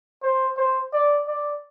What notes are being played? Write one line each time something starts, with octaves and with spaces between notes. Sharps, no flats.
C5
C5
D5
D5